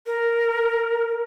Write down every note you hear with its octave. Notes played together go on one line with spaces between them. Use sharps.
A#4